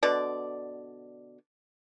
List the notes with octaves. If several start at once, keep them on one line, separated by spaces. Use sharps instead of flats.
B2 D3 D5